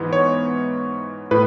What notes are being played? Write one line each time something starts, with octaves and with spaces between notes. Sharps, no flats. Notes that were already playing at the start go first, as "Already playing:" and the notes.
Already playing: G#2 E3 B3
C#5
A2 B4